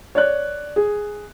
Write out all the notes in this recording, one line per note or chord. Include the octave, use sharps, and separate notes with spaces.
C#5 D5 F#6
G#4